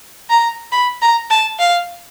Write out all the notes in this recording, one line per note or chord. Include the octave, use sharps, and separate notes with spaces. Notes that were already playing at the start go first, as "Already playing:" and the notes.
A#5
B5
A#5
A5
F5